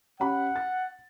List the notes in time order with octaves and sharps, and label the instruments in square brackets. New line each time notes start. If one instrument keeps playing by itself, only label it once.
[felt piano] C#4 G4 B5 [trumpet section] F#5
[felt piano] A6